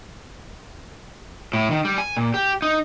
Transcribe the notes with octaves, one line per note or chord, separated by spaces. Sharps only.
A2
D#3
G3
G#5
A#2
G4
D#4